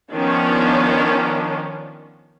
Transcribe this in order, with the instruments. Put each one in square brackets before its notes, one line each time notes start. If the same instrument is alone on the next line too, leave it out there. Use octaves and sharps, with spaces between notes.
[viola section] D#3 F3 B3 C#4 D4